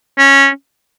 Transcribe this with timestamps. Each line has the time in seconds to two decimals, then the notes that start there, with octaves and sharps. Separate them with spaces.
0.18 C#4